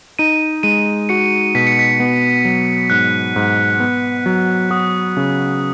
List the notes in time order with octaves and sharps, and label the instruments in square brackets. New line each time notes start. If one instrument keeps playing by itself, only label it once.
[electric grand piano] D#4 [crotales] D#7
[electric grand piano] G#3 [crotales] D#7
[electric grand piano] F#4 [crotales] C#7
[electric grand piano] B2 [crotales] B6
[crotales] C#7
B6
[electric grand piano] B3
F#3
[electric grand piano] G#2 [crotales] F#6
[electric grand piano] G#2
B3
F#3
[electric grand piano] F#4 [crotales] D#6
[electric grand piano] C#3